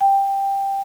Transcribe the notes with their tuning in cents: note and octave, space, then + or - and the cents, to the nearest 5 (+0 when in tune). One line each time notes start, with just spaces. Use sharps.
G5 +10